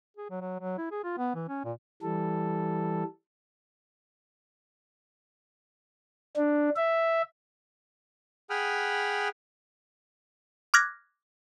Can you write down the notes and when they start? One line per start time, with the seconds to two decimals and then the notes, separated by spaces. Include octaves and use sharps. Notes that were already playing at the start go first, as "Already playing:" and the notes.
0.17 G#4
0.30 F#3
0.41 F#3
0.60 F#3
0.78 E4
0.91 G#4
1.04 F4
1.18 B3
1.35 E3
1.48 C#4
1.65 A#2
2.02 E3 G3 A4
6.36 D4
6.76 E5
8.50 G#4 F#5 G5 B5 D#6 F6
10.74 D6 F6 F#6 G#6 A#6